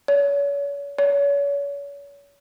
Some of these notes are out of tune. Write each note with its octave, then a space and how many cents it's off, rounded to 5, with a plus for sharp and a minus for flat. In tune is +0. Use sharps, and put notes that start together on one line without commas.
C#5 +40
C#5 +35